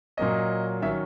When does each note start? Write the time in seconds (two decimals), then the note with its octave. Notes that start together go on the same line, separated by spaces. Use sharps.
0.17 A#2 F#3 A#3 C#4 D#5
0.82 D#3 F#3 C#4 E5